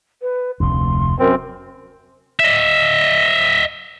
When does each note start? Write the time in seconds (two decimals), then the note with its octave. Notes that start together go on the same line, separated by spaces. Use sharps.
0.22 B4
0.60 F1 D2 C6
1.19 F#2 C4 A#4
2.39 D#5 E5